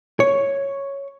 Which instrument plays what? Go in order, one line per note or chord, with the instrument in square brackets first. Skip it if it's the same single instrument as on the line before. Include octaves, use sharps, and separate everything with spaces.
[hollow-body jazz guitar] C#5